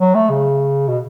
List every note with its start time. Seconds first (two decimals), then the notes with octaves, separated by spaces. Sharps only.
0.01 F#3
0.15 A3
0.30 C#3
0.88 B2